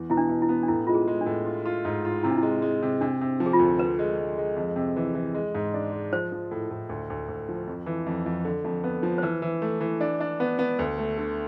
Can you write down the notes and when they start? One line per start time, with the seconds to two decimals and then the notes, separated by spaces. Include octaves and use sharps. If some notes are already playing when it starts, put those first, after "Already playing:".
Already playing: E2
0.10 B2 E4
0.17 D4
0.29 B2
0.42 E4
0.49 B3
0.63 D4
0.68 A2 E4
0.87 G#3 F4
0.95 G#4
1.08 G#3
1.21 D4
1.26 A2
1.46 F4
1.66 F4
1.85 G#2
2.05 F4
2.23 C3 E4
2.31 D4
2.38 G#3 E4
2.62 G#3
2.83 C3
3.01 C3 D4
3.21 C3
3.40 F3
3.46 G#4
3.53 F4
3.59 D2
3.79 D3 B4
3.99 G#3
4.18 G#3
4.38 G#3
4.56 F2
4.76 C3
4.96 E3
5.15 E3
5.35 G#3
5.55 G#2
5.74 D4
5.92 G#3
6.12 F3 C5
6.32 F3
6.51 A2
6.70 A2
6.89 D2
7.10 D2
7.28 D2
7.49 F3
7.67 F2
7.86 E3
8.06 F2
8.26 F2
8.45 D3
8.64 F2
8.84 B3
9.03 F3
9.18 C5
9.22 E3 B4
9.42 E3
9.62 A3
9.81 E3
10.01 D4
10.21 D4
10.40 B3
10.59 B3
10.79 D2
10.98 A3
11.18 D3